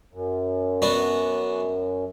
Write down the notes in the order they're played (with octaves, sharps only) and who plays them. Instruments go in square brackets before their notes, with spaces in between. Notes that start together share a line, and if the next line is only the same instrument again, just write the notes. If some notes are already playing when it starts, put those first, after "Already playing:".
[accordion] F#2
[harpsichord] B3 D4 F#4